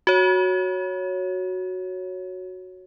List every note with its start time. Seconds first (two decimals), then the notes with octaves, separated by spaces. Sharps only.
0.07 F#4 C#5